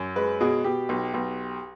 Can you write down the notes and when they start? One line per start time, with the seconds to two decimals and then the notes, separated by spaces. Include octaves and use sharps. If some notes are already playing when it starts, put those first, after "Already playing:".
Already playing: F#2
0.16 G#3 B4
0.41 B2 G#4
0.64 B2 G4
0.89 B1
1.14 B1